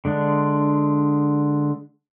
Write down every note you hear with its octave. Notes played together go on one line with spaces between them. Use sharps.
D3 G#3 D4